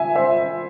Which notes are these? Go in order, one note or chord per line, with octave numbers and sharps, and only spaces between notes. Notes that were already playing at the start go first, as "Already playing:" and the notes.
Already playing: E5 G#5
C5 E5